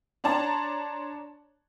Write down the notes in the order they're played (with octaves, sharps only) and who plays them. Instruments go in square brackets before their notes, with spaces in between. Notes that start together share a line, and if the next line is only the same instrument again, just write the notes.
[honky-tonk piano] D4 C#5 D5 A5 A#5 C6